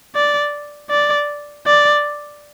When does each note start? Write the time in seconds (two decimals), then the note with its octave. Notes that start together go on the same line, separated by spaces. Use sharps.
0.15 D5
0.90 D5
1.66 D5